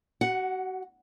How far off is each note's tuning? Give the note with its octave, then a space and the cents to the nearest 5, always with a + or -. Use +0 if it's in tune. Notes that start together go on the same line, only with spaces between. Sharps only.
F#4 +30 F#5 +0